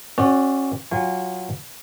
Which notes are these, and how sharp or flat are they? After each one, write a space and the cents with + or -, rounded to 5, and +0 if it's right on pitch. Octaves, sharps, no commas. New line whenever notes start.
C#4 -30 F#4 +0 D5 +0
F#3 +0 F4 +0 G#5 -35